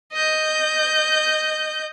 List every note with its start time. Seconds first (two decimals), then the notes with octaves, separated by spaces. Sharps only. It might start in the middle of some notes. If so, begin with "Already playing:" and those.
0.12 D#5 G6